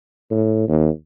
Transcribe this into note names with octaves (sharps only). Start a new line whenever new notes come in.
A2
D#2